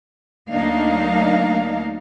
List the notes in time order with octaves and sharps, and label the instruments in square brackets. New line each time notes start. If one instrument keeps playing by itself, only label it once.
[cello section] D2 F#3 A#3 D4 D#4 F5